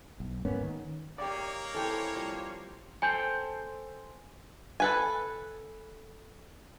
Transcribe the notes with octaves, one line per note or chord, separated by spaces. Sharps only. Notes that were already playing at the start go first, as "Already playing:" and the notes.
B1
G#2 A#3 B3 C#4
D#3
A#3 D#4 G4 C#5 D5
E3 C4 G4 A4 G5
F3 G3 C4
A4 C5 G5 G#5
A4 B4 G#5